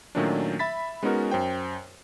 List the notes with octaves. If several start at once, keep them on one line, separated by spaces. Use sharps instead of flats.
A#2 D#3 F#3 A3 C#4 D4
E5 B5 A6 B6
G#3 B3 C#4 D#4 F#4 A#4
F#2 C5 G5